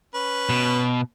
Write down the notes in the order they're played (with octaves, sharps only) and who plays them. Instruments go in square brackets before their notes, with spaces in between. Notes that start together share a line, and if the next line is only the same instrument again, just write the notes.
[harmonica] C#4 B4
[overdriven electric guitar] B2